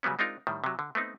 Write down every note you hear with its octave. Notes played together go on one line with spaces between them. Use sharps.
C#3 F#3 G3 B3 C#4
G#3 C4 D4 D#4 F4 A#4
A2 D#3 G3
C3 F#3
D3
A3 B3 C4 D#4